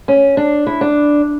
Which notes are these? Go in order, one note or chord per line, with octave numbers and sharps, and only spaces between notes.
C#4
D4
E4
D4